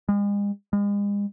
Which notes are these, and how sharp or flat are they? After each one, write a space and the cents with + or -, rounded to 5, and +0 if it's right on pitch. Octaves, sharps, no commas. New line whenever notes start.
G#3 -40
G#3 -40